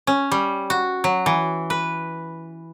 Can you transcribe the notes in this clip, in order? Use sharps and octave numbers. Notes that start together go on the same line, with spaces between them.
C#4
G3
F#4
F#3
E3
B4